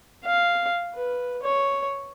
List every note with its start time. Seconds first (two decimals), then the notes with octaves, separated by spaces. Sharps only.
0.24 F5
0.95 B4
1.43 C#5